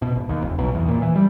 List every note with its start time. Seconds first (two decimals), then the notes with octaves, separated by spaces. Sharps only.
0.02 B2
0.16 G#1
0.29 D#2
0.42 F1
0.58 B1
0.75 E2
0.88 A#2
1.02 E3
1.16 G3